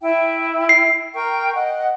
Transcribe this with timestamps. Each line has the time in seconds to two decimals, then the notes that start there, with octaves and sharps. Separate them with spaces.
0.03 E4 E5 G5
0.69 C7
1.14 A#4 G5 C#6
1.55 D#5 F#5